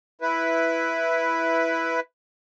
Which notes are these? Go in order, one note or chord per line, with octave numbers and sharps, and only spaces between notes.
E4 B4